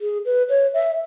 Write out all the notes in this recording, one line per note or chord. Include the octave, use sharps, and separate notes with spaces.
G#4
B4
C#5
E5